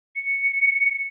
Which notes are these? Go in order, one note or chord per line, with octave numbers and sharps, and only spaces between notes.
C#7